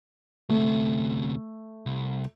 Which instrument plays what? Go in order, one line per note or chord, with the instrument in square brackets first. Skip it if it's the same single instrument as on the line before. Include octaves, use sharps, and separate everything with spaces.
[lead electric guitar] D2 C3 [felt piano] A3
[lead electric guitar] C2